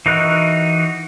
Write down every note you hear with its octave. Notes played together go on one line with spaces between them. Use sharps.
E3 D#4 F#4 A#4 F#6